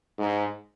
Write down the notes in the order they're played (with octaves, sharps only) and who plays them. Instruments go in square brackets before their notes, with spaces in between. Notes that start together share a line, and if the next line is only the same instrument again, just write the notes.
[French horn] G#2